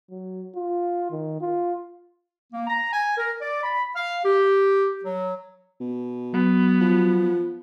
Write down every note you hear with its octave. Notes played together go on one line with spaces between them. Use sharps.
F#3
F4
D#3
F4
A#3
A#5
G#5
A#4
D5
B5
F5
G4
F#3
B2
F#3 B3
F3